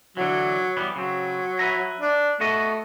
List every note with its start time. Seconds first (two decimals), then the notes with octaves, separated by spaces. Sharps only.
0.17 D3 E3 F#3
0.77 E3 G3 B3
0.96 C#3 F#3 C4
1.59 B4 E5 A#5
2.00 D4
2.40 A3 B3 F#4 D#5